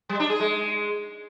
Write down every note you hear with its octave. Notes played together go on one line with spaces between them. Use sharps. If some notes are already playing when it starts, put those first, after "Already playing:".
G3
D4
G#4
G#3